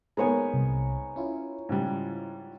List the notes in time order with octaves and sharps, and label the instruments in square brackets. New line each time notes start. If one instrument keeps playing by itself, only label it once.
[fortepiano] G#3 A#3 B3 [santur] D#4 C#5 G#5
[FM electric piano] C2
C#4 E4 F4
[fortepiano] G#2 C#3 G3